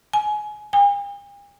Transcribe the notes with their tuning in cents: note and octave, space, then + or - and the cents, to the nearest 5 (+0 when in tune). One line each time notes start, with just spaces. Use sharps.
G#5 +20
G#5 -45